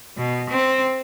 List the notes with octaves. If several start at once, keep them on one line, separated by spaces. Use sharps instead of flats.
B2
C4